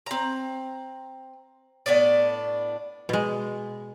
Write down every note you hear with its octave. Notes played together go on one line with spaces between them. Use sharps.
C4 A#5
A2 B3 D4 D5
B2 G#3